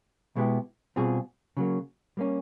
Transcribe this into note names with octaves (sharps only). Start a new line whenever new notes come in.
B2 G#3 B3 E4 G4
B2 G3 C4 F4 G#4
C#3 F#3 A#3
G3 A#3 C#4